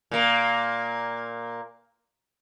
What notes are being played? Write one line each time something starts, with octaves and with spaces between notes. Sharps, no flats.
A#2 A#3